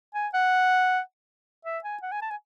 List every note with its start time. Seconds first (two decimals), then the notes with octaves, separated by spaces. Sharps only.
0.15 G#5
0.34 F#5
1.65 E5
1.84 G#5
2.02 F#5
2.12 G#5
2.21 A5
2.30 G#5